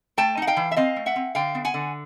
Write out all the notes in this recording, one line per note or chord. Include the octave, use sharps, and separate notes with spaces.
A3 G5 A5
D#4 F#5
F5 G5
E3
E5
C4 D#5 F5
A3
E5 F#5
C4
D3 F5 G5
B3
F#5 G#5
D3